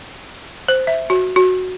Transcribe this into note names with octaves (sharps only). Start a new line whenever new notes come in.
C5
E5
F#4
F#4